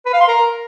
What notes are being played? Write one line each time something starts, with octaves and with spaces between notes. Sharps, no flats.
B4
F5
C6
A#4